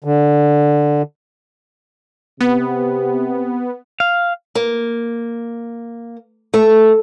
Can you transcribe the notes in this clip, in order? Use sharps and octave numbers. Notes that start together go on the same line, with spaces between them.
D3
C3 B3 G4
F5
A#3
A3